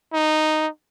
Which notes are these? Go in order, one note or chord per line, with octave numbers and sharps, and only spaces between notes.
D#4